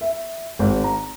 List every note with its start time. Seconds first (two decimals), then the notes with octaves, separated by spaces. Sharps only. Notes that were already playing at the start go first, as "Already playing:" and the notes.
0.01 E5
0.59 G#1
0.84 A#5